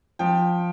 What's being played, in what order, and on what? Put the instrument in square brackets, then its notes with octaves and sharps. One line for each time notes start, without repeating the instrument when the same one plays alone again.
[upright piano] F3 G5